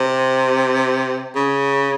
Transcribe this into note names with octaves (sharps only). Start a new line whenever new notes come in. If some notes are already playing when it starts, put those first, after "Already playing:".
Already playing: C3
C#3